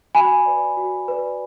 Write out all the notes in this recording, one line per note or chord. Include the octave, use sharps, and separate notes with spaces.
F#4 G#5 B5
B4 D5
F#4
B4 D5